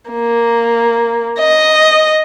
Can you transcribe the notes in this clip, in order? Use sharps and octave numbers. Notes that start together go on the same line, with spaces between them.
A#3
D#5